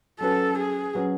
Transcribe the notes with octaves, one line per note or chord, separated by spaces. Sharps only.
F#3 C#4 F#4 A4 B4
G#4
F#3 C#4 F#4 B4